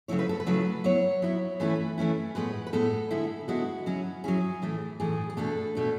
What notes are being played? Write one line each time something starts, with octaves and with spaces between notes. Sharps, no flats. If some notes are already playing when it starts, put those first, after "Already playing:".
C#3 F#3 A3 E4 C#5
B4
A4
B4
C#3 F#3 A3 E4
F#3 B3 E4 C#5
F#3 B3 E4
E3 A3 C#4 E4 B4
E3 A3 C#4 E4
A2 G#3 B3 B4
B4
A2 G#3 B3 A4
D3 G#3 B3 E4
D3 G#3 B3 E4 F#4
F#3 C#4 E4
F#3 C#4 E4 G#4
A2 E3 A3
A2 E3 A3 G#4
G#4
B2 A3 D4 A4
B2 A3 D4